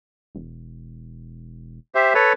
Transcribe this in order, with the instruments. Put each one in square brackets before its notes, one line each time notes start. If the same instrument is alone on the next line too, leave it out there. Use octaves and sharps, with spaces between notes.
[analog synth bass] E1
[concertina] G4 C5 E5
A4 B4 C#5